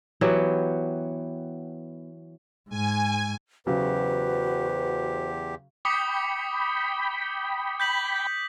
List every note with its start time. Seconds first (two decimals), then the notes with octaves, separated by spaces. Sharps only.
0.21 E3 F#3 B3 G4
2.70 G#2 G#5
3.67 E2 C#3 F#3 F#4 G4 B4 C5
5.85 G5 B5 D6 D#6 C#7
7.80 G6 B6 F#7